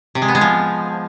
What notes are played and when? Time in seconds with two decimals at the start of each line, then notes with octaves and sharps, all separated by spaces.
0.15 C3
0.22 G#3
0.28 B3
0.35 G#3
0.41 F3